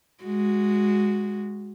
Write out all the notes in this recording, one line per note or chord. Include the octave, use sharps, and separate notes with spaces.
G#3 F#4